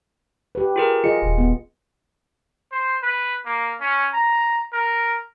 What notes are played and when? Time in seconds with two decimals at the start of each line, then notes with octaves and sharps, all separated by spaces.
0.55 G4 B4
0.76 F4 G#4 A#4
1.04 F4 G#4 D#5 C#7
1.22 D#1
1.38 B3
2.72 C5
3.03 B4
3.45 A#3
3.81 C#4
4.14 A#5
4.73 A#4